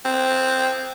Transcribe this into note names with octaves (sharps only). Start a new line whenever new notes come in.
C4